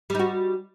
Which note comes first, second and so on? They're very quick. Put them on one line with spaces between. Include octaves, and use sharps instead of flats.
G3 D#4 F#4